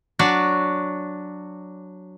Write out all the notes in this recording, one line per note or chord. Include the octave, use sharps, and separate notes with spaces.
F#3 D4 F#4 D5